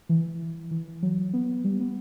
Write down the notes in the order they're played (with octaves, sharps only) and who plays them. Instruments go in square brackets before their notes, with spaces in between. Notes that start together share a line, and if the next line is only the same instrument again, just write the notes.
[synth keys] E3
E3
F#3
B3
G3
B3